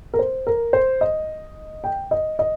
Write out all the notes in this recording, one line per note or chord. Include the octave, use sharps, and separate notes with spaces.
A#4
C5
A#4
C5
D#5
G5
D#5
D#5